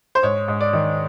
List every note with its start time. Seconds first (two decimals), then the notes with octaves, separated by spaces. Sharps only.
0.15 C5
0.23 G#2 C#5
0.48 G#2
0.61 D5
0.73 D#3